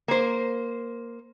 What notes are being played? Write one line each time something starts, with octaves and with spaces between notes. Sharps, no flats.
A#3 C5